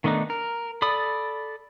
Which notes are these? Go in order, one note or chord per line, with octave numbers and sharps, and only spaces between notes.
D#3 A3 B3 D4 D#4
A#4
A4 D5 B5 D#6